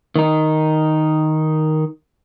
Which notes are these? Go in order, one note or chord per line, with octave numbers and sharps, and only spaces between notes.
D#3 D#4